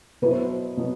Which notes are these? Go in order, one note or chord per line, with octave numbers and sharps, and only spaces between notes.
B2 F#3 B3 E4 B4
C5
B4
B2 F#3 B3